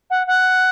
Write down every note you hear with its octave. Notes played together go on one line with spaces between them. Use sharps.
F#5
F#5